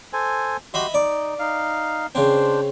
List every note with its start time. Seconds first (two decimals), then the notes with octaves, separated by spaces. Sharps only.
0.13 A4 C5 G#5
0.74 F#4 G4 D#5 E5 B5 C6
0.94 D#4 D5
1.39 D#4 F5
2.15 C#3 C4 D4 C5